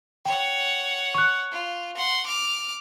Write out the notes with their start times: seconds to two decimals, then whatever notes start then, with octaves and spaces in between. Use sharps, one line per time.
0.25 C#5 F#5 G5
1.15 C#6 F#6
1.52 F4
1.96 F#5 C6
2.26 D6 F6